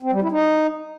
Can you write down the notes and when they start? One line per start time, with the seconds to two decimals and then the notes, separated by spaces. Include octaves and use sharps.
0.03 C4
0.12 G3
0.22 E4
0.31 D#4